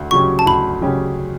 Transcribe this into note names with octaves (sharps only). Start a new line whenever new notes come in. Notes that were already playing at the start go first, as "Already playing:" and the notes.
Already playing: D2
C#3 F#3 C#4 G4 C#6
A5
D2 B5
C#3 F#3 C#4 G4